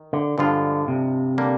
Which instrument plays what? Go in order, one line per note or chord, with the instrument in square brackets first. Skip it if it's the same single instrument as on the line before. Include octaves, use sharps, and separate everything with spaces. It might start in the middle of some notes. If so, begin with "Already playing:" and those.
Already playing: [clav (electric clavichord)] D#3
[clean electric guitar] D3
[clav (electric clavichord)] G2 F3 G#3 D4 F4 [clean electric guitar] D3
[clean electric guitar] C3
[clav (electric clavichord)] D3 G3 A#3